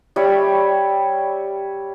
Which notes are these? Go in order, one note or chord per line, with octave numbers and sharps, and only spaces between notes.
G3 C#5 E5